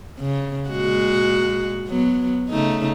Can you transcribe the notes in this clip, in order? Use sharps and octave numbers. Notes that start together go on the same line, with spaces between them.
C#3
A#2 G#3 F#4
F#3 B3
C#3 A3 D#4